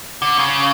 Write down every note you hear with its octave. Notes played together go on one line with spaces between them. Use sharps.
D3
C#3